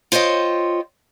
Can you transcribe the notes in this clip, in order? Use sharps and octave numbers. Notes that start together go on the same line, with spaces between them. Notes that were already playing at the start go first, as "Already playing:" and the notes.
F4 C5 C#5 D#5 G5